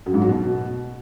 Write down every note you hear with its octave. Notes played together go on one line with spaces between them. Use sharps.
F#2
G#2
F#3
B2